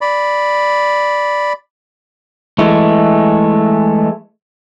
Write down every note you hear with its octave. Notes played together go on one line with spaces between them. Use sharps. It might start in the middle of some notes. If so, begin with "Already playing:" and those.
D5 B5
E3 G#3 A3